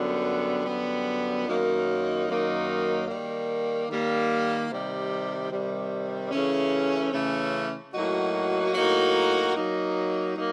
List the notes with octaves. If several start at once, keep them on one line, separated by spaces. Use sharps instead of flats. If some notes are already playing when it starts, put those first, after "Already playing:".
Already playing: F#2 D3 G3 B3
F#2 D3 G3 B3
F#2 D#3 F#3 A#3 D#4
F#2 D#3 F#3 A#3 D#4
D#3 G3 A#3
D#3 G3 A#3
C3 D#3 G3
C3 D#3 G3
C#3 E3 A3 C#4
C#3 E3 A3 C#4
A2 F#3 A#3 D#4 F#4
A2 F#3 A#3 D#4 F#4
F#3 A#3 D#4
F#3 A#3 D#4